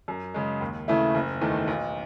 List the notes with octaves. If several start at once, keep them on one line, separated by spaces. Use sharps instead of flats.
F#2
C#3 G#3
D#2
C#3 E3 A3 E4
F#1
E2 D#3 A3
B1